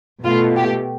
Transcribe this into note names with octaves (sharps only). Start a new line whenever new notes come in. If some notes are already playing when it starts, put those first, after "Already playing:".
B2 A3 F4
G4